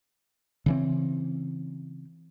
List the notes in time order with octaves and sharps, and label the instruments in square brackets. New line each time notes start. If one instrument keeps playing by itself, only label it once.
[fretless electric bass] C#3 E3 C4